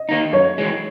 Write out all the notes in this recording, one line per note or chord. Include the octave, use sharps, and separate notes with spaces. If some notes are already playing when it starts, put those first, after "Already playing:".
Already playing: D#5
D#3 A#3 D#4
F#2 C#5
E3 G#3